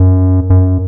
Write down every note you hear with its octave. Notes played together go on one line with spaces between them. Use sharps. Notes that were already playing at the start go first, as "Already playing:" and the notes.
Already playing: F#2
F#2